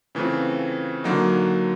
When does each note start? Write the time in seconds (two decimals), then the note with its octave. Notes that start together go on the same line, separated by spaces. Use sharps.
0.15 C#3 E3 A3 C4 F4
1.04 D3 F#3 A#3 D#4